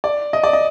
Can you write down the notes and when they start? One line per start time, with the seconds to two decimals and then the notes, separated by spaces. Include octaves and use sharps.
0.04 D5
0.33 D#5
0.44 D5
0.53 D#5